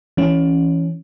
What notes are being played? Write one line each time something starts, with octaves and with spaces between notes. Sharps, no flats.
E3 C#4